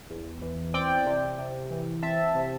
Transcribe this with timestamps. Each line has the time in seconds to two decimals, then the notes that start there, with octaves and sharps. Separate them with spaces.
0.10 E2
0.42 E3
0.74 C4 D5 G5
1.06 C3
1.38 C3
1.71 E3
2.02 C4 E5 A5
2.35 C3